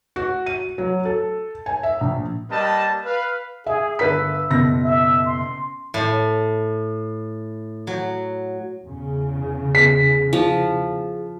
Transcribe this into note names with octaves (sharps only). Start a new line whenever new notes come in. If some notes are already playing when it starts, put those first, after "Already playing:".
F#4
D#7
F#3
A4
G#5
E5
A#1
G3 A#3 B4 D#5 A5
B4 F5
G#4 E5
G1 B4 E5 B6
F#1 B2 A#6
E5
C6
A2
F#3
E2 C#3
G#4 B6
F3